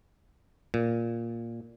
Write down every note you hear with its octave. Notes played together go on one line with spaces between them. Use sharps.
A#2